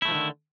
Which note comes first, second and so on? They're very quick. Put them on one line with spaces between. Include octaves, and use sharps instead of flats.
E4 A3 F3 D#3 D3